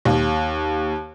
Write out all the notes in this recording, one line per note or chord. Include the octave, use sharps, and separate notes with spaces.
D#2